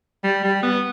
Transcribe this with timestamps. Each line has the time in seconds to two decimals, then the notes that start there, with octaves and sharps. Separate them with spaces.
0.24 G3
0.44 G3
0.63 B3